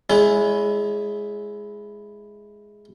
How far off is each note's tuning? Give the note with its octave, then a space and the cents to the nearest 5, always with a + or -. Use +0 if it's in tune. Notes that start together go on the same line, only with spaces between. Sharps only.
G#3 +0 E4 +0 C#5 +45